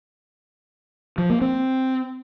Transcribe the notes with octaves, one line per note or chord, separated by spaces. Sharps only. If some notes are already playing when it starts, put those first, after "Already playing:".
F3
A#3
C4